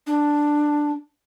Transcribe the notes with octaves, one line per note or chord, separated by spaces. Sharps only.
D4